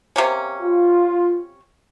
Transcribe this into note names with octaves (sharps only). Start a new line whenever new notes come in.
C3 A#3 C#4
F4